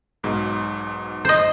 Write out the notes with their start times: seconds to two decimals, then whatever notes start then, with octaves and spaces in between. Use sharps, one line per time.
0.23 B1 G#2 B2
1.25 C5 D#5